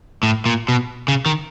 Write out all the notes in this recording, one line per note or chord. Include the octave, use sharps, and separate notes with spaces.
A2
A#2
B2
C#3
D#3